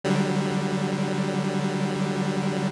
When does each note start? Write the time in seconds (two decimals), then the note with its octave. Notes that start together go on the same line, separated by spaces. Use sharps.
0.04 D3 F#3 G3